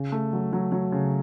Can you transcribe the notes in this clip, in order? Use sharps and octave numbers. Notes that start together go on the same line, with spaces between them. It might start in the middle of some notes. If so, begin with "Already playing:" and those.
Already playing: C#3
A3
F#3
F#3
F#3
C#3